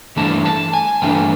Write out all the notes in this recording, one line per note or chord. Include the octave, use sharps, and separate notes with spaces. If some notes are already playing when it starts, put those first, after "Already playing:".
G2 E3 A3 D4 A5
A5
G#5
G2 E3 A3 D4 G5